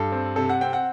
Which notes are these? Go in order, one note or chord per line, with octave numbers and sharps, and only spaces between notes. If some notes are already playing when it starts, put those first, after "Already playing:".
Already playing: G2 A4
C4
C3 A4
F#5
C4 G5
F#5